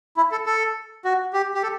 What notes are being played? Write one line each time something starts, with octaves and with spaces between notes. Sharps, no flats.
E4
A4
A4
F#4
G4
G4
A4